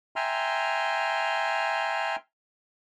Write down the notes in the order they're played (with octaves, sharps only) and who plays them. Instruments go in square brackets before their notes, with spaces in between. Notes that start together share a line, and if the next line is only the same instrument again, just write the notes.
[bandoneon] E5 G5 G#5 A#5 C6 F6